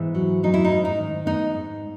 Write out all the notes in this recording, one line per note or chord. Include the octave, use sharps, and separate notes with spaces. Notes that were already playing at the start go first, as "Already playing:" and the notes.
Already playing: G#2 E3 B3 E4
F#3
F#3 D#4
E4
D#4
G#2
D#4
D#3
B3 D#4
G#2